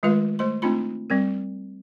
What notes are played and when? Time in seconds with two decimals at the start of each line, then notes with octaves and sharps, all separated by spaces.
0.03 D#3 G#3 A3 F4 B4 F5
0.39 A3 C5 C6
0.62 A3 C4 D4 D#4 F4 B5
1.10 G3 C4 A#4